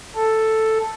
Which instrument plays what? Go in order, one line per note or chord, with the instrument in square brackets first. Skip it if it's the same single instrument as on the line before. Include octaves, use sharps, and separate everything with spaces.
[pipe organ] A4